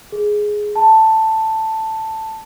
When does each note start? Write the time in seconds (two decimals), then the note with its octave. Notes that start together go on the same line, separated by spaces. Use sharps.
0.12 G#4
0.76 A5